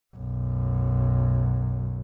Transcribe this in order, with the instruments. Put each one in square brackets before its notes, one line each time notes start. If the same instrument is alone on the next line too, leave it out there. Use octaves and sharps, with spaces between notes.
[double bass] B1 F#2